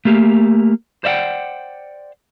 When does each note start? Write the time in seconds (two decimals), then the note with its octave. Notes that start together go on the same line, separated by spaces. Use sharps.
0.05 A3 A#3 G4
1.04 C5 D5 E5 F#5 G5